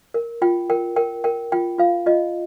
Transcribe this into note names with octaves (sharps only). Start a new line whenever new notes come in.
A#4
F4 G5
A#4 G5
A#4 G5
A#4 G5
F4 G5
F4 F5
F4 D#5